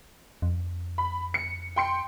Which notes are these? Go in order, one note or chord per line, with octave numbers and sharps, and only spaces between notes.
F2
B5
C#7
G5 C6 C#7